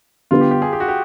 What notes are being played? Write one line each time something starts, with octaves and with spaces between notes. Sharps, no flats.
D3 G3 B3 F4
G4
G4
G#4
G4
F#4
G4